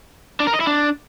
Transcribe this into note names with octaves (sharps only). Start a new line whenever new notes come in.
D4
A#4
D#5
E4
D4